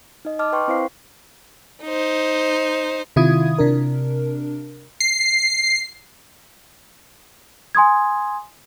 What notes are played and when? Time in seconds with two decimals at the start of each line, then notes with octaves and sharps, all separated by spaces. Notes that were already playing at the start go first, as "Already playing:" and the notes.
0.25 D#4 D#5
0.39 D#5 A5 D6 F6
0.53 B4 G5 C6 C#6
0.68 C4 E4 C5 F5 C7
1.83 D#4 C5
3.16 C3 D#3 E4 F4 D#6 G#6
3.59 C3 D4 A#4
5.00 C7
7.75 G#5 C6 D#6 G#6